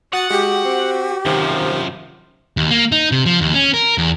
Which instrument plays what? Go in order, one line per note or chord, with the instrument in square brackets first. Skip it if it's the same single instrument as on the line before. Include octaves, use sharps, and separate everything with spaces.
[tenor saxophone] F#4 [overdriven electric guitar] F#5 [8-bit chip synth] D#6 A6 C#7
[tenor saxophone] G#3 [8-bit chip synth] F#4 [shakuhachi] G4
[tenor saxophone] C4
[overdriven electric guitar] F#2 F3 [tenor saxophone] C3 [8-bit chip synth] D#3
[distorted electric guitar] D#2
A#3
D#4
C3
F3
D#2
C#4
A#4
E2